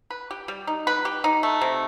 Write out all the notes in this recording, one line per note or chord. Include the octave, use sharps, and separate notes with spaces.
B4
G4
G3
D#4
B4
G4
D#4
A3
C3